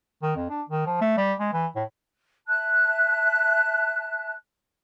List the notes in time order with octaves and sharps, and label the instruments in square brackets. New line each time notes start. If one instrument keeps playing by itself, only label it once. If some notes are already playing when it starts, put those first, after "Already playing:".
[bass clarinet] D#3
F2
D4
D#3
F3
A3
G3
G#3
E3
A2
[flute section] E5 A5 F#6